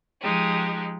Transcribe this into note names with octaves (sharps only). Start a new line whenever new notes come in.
F3 G#3 D#4 G4